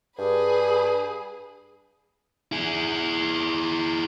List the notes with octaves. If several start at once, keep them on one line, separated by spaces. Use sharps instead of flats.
G2 G#4 B4
E4 G#4